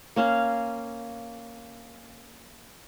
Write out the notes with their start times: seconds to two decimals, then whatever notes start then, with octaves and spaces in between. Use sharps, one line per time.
0.16 A#3 C#4 F5 A#5